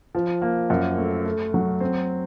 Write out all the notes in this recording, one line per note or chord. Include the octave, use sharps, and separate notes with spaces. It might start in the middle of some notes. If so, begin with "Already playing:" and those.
F3
A#3
F#2
A3
A3
F#3
C4